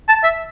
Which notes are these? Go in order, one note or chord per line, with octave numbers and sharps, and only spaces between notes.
A5
E5